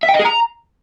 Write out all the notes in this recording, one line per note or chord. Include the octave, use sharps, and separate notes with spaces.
E5
G5
D#5
G#4
A#5